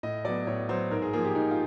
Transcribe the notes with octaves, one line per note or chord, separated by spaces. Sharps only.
A2 D#5
F#3 B3 D5
A2 C#5
F#3 B3 C5
G#2 A#4
G#4
F3 A#3 G#4
G4
G#2 D#4
F4